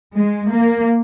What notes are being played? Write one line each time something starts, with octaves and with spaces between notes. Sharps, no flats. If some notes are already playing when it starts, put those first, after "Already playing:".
G#3
A#3